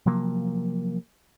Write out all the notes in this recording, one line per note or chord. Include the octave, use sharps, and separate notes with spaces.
C3 F3 F#3 A#3